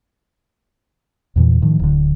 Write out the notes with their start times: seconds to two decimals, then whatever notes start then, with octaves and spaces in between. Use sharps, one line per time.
1.36 E2 A#2 E3
1.62 A2 D#3 F3
1.79 D1 D3